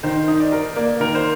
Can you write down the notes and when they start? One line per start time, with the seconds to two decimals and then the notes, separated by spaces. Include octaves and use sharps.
0.03 D#3 C5
0.28 D#4
0.40 D5
0.52 A#4
0.76 A#3 D5
1.00 D#3 A#4
1.15 C5